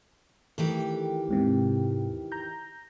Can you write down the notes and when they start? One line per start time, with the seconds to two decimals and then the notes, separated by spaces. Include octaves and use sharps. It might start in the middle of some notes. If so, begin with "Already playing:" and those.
0.58 D#3 E3 A3 G4
1.28 D#2 G#2 C3
2.32 A#5 G6